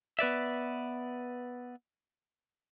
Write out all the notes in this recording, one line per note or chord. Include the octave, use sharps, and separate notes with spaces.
B3 B4 D5 E5